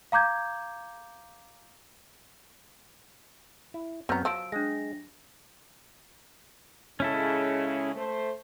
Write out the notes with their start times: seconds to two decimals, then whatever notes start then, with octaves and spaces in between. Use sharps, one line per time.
0.12 F5 A#5 D6 G6 G#6
3.74 E4
4.09 F#2 B3 C4 C#5 A#5 F6 G6
4.25 F3 F#3 A5 E6 D7
4.52 G#3 D4 A#6
7.00 C#3 G#3 C#4 E4 A4
7.95 A3 C5